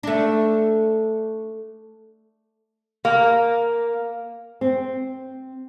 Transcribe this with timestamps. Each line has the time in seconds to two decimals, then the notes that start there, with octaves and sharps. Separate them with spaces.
0.03 A3 D4
3.05 A#3
4.61 C4